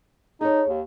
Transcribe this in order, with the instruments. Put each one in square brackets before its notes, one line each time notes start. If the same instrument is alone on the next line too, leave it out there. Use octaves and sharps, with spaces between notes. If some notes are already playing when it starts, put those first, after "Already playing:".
[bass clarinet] D#4 [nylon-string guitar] G#4 A4 C#5
[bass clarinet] D#2